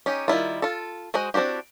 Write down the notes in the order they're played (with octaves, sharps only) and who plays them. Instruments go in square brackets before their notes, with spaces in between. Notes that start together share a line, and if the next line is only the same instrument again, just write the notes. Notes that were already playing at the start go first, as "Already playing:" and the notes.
[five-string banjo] C#4 D#4 G4
D#3 G3 E4 F4
F4 A4
G#3 F#4 C5 D#5
C4 D4 E4 F#4 G4